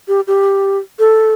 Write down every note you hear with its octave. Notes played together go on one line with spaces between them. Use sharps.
G4
G4
A4